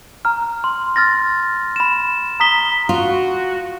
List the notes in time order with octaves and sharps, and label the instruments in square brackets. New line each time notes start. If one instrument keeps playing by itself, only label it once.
[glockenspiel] A#5 F6
C6
F6 A6 A#6
B5 E7
A#5 D#6 B6 G7
[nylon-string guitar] F4 [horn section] F#4